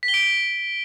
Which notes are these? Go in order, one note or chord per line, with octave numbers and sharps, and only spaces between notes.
B6
G7
D7